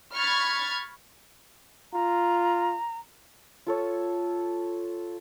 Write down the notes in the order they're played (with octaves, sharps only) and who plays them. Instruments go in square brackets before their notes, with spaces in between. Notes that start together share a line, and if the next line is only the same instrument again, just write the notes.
[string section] B5 C#6 F6 G#6 A6
[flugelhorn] F4 [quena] A#5
[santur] F4 A4 C#5